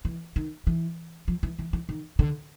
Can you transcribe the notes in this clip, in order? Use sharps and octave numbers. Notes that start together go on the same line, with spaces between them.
E3
D#3
E3
F3
E3
E3
E3
D#3
D3